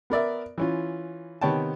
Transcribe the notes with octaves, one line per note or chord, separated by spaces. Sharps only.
B3 A#4 D5 E5
E3 C#4 F4
C3 D#3 B3 C#5 G5 A5